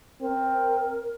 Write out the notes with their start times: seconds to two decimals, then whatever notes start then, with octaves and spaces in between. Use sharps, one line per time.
0.22 C4 A#4